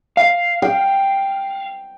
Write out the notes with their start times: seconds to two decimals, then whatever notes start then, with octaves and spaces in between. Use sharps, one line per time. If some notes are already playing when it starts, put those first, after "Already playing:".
0.17 F5
0.62 G5